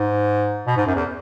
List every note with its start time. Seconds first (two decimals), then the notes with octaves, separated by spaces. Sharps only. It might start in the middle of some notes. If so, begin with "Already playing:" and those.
Already playing: G#2
0.67 B2
0.77 G#2
0.86 F#2
0.96 E2